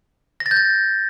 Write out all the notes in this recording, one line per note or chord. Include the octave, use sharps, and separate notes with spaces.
A#6
A6
G6
A6